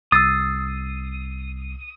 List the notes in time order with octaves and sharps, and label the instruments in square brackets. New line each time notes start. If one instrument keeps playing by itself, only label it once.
[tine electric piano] C2 C7 [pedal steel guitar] D#6 [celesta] E6 A6